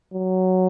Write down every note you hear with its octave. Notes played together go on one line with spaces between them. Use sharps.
F#3